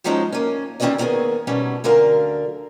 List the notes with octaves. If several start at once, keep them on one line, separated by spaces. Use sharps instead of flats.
D#3 F3 F#3 G#3 C#4 D#4
A#3 C#4
D#3 C4 C#4 F#4 D5 D#5
D#3 A#3 B3 C#4 G#4
B2 F#3 G3 A3 C#4 D#4
D2 D3 F#3 A#4 F5